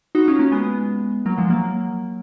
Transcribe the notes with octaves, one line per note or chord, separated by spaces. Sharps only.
D#4 F#4
C#4 F4
A#3 C#4
G#3 B3
F#3 A#3
F3 G#3
F#3 A#3